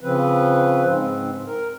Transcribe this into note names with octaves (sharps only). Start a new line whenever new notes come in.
C#3 F3 C4 B4
G#2 C4
A#4